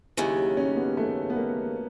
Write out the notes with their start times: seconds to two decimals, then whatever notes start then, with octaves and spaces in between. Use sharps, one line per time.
0.17 D#2 C#3 F#3 E4
0.57 C#4
0.76 B3
0.97 A3
1.30 B3
1.37 A#3